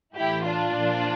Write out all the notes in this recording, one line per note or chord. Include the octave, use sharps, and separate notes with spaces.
A2 E3 E4 G4
D4 F4
A#2 F3